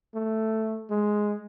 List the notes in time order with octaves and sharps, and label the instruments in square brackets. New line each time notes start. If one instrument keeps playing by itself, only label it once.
[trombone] A3
G#3